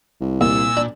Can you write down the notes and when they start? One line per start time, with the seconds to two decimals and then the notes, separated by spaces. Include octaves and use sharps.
0.21 C2
0.41 D#2 A#2 E6
0.77 D4